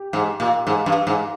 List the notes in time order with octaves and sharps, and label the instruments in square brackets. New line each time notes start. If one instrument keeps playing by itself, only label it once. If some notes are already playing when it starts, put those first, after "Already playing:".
Already playing: [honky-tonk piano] G4
[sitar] G#2
A#2
G#2
G2
G#2